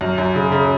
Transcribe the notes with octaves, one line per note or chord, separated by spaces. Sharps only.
F#2
F#2
C#3
C#3